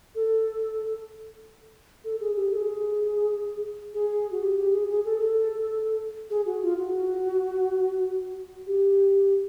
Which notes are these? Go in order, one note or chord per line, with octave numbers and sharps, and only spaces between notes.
A4
A4
G#4
G4
A4
G#4
G#4
F#4
G4
G4
G#4
G#4
A4
A4
G#4
F#4
F4
F#4
G4